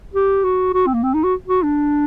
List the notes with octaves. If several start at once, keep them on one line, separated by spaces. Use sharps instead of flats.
G4
F#4
F#4
C4
A#3
C4
D#4
F#4
F#4
D4